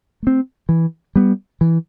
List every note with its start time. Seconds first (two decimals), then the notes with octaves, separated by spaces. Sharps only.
0.23 A3 C4
0.69 E3
1.16 G3 B3
1.61 E3